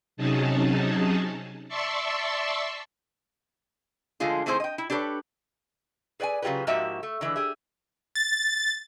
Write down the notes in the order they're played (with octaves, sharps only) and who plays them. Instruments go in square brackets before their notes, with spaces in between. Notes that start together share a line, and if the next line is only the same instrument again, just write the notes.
[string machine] C3 F#3 C#4 D#4 G#4 A5
D5 E5 A5 C6 C#6 E6
[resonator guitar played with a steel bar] D3 F3 G#3 A3 F4 G#4
D#3 A3 C4 E4 G#4 C5
D#5 G5
E4
D4 G4 A4 B4 C#5
G#4 B4 D5 G5 G#5
C#3 F#3 F4 G4 G#4 B4
G#2 F3 A#3 F#4 G4 E5
A3
D3 E3 F3 G#3
G4 G#4 E5
[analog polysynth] A6